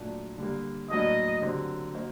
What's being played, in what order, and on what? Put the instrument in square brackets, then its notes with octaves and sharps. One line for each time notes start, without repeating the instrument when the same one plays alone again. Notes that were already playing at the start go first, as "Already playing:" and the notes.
Already playing: [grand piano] A#2 F#3 A3 D4
D3 G3 A#3
[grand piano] A2 F#3 A#3 D4 F#4 [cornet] D#5
[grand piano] D3 F#3 C4 G4
A#3 F#4 C5 D#5